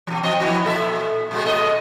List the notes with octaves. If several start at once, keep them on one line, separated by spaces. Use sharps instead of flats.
B2 F3
F3 C4 D#5
F3 B3 E4
A#2 A4 E5
A#2 G#3 A3
A#2 A4 D#5